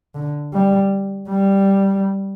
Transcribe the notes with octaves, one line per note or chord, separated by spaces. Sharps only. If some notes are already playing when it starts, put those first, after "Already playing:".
D3
G3
G3